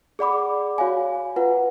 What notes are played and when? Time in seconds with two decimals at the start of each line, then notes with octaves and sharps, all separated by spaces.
0.19 G#4 D5 F#5 B5 D6
0.78 F#4 C#5 F5 G#5
1.36 F4 B4 F#5